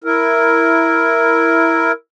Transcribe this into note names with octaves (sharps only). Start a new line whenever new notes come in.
E4 A#4